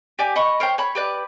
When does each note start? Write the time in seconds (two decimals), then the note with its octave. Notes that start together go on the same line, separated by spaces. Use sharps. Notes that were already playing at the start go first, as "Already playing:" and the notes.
0.19 G4 D5 G#5
0.36 D#5 B5 C#6
0.60 A#4 C5 C#5 G5
0.78 C#5 B5
0.95 G4 B4 D5